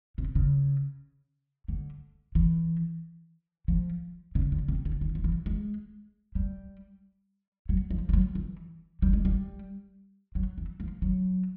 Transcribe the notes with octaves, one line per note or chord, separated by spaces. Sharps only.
C3
C#3
D3
E3
F3
C#3
D3
C3
D3
D#3
F3
E3
G#3
G3
F#3
F3
G3
F#3
E3
G3
G#3
G3
F#3
E3
F3
F#3